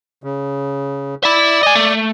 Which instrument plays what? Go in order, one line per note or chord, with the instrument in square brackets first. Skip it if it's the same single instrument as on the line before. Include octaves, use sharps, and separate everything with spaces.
[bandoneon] C#3
[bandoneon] D5 [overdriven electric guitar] E5 B5
[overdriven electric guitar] D#5 G#5
A3